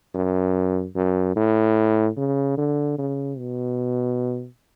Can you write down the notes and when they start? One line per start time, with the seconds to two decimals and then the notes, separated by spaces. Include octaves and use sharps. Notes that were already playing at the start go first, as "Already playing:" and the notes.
0.14 F#2
0.95 F#2
1.36 A2
2.17 C#3
2.57 D3
2.98 C#3
3.38 B2